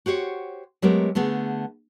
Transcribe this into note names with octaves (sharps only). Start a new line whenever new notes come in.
F#4 G4 C5 C#5
F#3 G#3 A3 B3 G4 A#4
D3 A3 B3 G#4